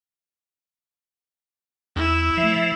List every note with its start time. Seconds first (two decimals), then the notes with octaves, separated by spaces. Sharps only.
1.96 E2 E4 E6
2.37 F3 A3 E5